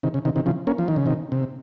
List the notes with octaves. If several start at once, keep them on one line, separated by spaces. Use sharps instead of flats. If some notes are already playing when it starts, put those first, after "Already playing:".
C3 D#3
C#3
C3 D#3
C3 D#3
C#3 F3
A#3 C#4
F3
D#3
C#3
C3 D#3
C3